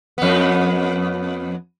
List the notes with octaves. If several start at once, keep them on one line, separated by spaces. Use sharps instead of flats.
F2 B3